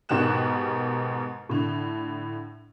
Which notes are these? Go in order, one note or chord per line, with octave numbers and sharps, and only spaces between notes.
G#2 B2 D#3 G4 F#6 E7
A2 D3